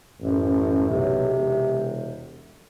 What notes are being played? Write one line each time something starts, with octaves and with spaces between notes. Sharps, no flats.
A1 F#2
B1 C3
E1